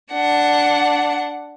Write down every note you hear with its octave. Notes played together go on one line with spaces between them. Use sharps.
D4 F#5